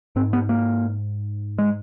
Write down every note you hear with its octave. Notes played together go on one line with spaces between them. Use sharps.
G#2 C4
B3
A#3
G#3